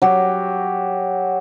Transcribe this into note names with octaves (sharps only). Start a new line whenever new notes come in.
F#3 G4